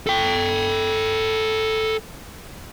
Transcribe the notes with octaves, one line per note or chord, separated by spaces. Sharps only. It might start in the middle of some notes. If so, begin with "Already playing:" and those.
A4 G5